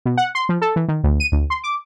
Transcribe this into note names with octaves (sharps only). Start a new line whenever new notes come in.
B2
F#5
C6
F3
A4
E3
D#3
D2
D#7
D2
C6
D6